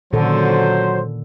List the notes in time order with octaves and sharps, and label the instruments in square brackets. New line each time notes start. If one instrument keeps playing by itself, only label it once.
[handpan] A#2 D#3 A4 [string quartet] D3 C#4 [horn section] F#3 C5